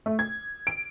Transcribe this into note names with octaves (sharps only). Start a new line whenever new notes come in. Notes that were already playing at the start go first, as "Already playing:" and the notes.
A3
G#6
D7